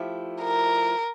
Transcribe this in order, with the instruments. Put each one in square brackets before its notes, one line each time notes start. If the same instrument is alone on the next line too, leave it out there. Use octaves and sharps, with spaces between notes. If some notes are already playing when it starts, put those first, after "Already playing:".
Already playing: [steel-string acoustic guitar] F3 A3 E4 G4
[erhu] A#4